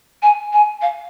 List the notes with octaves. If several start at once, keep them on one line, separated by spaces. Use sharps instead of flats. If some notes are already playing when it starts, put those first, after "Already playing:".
G#5
G#5
F5